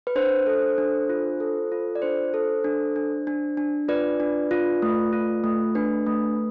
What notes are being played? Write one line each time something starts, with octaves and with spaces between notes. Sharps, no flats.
B4
D4 C5
A4
D4
F4
A4
F4
D5
D4 C5
A4
D4
D4
D4
D4
F4 B4 D5
D4
F4
A3
F4
A3
D4 B4
A3